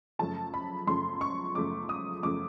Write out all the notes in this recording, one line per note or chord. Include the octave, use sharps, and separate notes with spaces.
F#2 C#3 F3 A3 A5
B5
F#2 C#3 F3 A3 C6
C#6
F#2 C#3 F3 A3 D6
D#6
F#2 C#3 F3 A3 D6